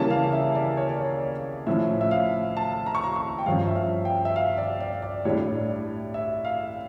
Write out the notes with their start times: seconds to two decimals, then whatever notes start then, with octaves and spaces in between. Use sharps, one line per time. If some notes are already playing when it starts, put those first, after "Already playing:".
Already playing: C#3 E3 G3 A#3 C#4 A5
0.10 F5
0.33 E5
0.55 D5
0.77 C#5
0.89 D5
1.00 C#5
1.67 A2 F3 C#4 E5
2.01 E5
2.11 F5
2.57 A5
2.86 A#5
2.95 C#6
3.04 A#5
3.16 C#6
3.39 G5
3.46 G2 F3 C#4 F5
3.67 E5
3.75 F5
4.05 G5
4.25 E5
4.36 F5
4.58 D5
4.80 D5
5.02 D5
5.25 A2 G3 D4 C#5
5.70 D5
6.14 E5
6.45 F5